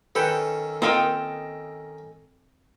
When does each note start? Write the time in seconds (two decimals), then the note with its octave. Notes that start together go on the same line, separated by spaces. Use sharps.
0.15 D#3 C#4 A4 B4 G5 B5 D#6
0.82 A#3 C4 F4 A4 A#4 D#5 F5 G5